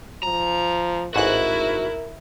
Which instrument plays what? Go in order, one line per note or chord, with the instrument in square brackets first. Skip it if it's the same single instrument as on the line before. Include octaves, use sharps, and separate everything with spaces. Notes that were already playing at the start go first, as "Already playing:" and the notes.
[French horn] F3 [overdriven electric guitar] A#5
[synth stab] A1 G#2 F#6 [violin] E4 [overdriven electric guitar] F#4 [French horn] A#4